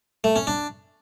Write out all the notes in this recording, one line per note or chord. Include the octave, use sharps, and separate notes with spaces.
A3
C#4
D4